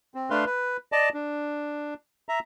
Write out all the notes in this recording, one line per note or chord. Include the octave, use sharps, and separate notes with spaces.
C4
A3 D4 B4 F5 C6
B4
D5 D#5 A5
D4
E5 A#5